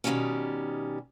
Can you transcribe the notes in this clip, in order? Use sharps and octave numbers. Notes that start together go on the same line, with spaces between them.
B2 D#3 E3 F#3 G3 C#4